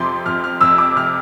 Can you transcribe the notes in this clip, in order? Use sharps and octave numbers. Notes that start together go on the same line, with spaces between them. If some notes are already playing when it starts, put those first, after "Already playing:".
Already playing: F2 C3 F3 C6 D6
F2 F6
F6
F2 E6
D6
C3 F6